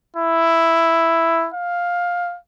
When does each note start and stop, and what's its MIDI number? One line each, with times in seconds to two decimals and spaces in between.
0.16 1.49 64
1.54 2.37 77